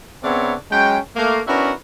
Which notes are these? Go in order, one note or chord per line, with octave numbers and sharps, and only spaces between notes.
C#3 B3 C4 D4 C#5 E5
F#3 G#3 C#4 G5
A3 A#3
B3 C#4 D4 E4 F#4 A#4